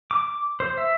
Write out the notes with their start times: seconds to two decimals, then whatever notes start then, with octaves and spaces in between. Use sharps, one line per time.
0.11 D6
0.60 C5
0.77 E5